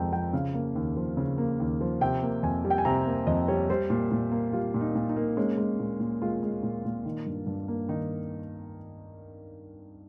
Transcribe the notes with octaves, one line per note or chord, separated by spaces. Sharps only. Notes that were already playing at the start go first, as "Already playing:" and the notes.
Already playing: F2 C3 G#3 G5 A#5
F3 G5
C#3 F5
A#3
D#2
F3
C#3
A#3
D#2
F3
C3 G5
A#3
F2 G#5
G3
G5
G#5
C3 A#5
A#3
F2 D#5
G3 C#5
G3 C5
A#2
A#2
A#3
G3 F4
A#2
D#4
A#2
D#4
A#3
G#3 C#4
G#3
A#2
A#2
G#3 F4
G#3
A#2
A#2
D#3
G2
G2
A#3
D#3 D#4